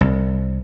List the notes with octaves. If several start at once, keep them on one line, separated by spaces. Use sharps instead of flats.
C2